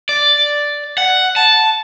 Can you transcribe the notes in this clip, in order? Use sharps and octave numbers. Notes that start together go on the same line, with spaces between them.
D5
F#5
A5